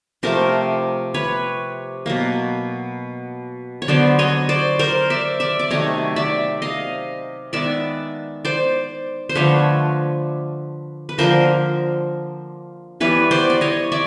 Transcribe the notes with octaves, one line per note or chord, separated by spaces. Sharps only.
C3 F3 A3 A#4 C5
B4 C#5
B2 F#3 A#3
C#5
D3 F#3 B3 C5 D5
C#5 D#5
C5 D5
A#4 C5
D5 E5
D5 E5
D5
C3 D#3 F#3 A3 C#5 D#5
D5 E5
D#5 F5
D#3 G#3 B3 D5 E5
C5 D5
C5
D3 F3 A3 B4 C#5
B4
D3 F3 A#3 A#4 C5
E3 G3 B3 B4 C#5
C5 D5
D5
C#5 D#5
D5 E5